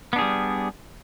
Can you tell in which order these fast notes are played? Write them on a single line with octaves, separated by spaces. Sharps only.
B3 D4 G#4 G3